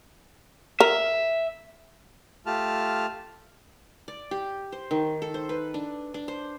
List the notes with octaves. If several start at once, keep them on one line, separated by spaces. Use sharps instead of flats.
A#4 E5
A3 F4 G4 A5 F6
D5
G4
C5
D#3
A4
C5
B4
D4
D4
C5